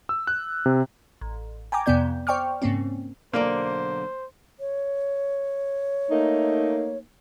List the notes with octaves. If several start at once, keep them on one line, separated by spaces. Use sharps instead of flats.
E6
F#6
C3
A1
G5 G#5 A#5 D6
F2 C3 B3 D5 G6
C5 D5 G5 C#6 D6 F6
G#2 C#3 A#3 C4 C#4
B1 D3 A#3 C5 D5
C#5
A3 A#3 D#4